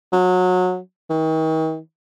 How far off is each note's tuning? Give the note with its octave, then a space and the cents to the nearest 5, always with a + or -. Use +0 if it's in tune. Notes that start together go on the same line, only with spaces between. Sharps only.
F#3 -25
D#3 +40